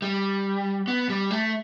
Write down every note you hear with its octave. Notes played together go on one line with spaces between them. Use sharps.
G3
B3
G3
A3